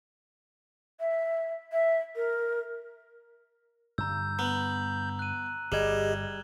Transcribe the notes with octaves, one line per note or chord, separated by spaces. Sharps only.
E5
E5
A#4
G2 D3 G3 A#5 E6 G6
B3 A#5 F#7
F#6 D#7
G1 G3 G4 G#4 D#5 G#6 E7 F#7